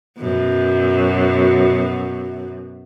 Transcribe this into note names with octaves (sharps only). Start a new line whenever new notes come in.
F#2 B2